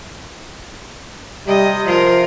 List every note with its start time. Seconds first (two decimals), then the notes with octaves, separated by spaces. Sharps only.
1.47 C3 G3 D#5
1.86 F3 F4 A#4